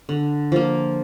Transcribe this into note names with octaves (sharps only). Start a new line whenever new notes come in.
D3
F3 A#3